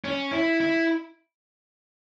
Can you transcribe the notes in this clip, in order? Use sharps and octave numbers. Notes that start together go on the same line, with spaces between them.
C#4
E4
E4